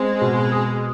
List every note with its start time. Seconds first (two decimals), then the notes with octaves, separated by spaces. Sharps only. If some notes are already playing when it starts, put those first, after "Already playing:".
Already playing: G#3 C4
0.21 B2
0.52 G#4